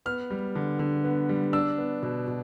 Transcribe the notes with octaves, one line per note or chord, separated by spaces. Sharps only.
B3 F6
G3
D3
D3
B3
G3
D4 E6
B3
B2
B2